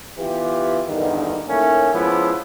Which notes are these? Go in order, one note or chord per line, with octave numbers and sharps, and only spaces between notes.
E3 B3 F4 G4
E2 G2 D3 D#3
A2 D#3 A3 A#3 C#4
F3 G#3 B3 C#4 E4